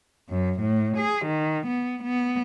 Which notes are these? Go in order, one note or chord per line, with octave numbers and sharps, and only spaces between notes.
F#2
A2
G#4
D#3
B3
B3